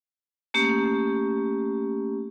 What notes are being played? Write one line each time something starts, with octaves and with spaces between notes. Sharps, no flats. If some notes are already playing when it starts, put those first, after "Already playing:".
A3 A#3 C#4 G4